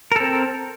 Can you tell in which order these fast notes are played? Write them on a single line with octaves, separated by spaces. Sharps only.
A#4 A4 C4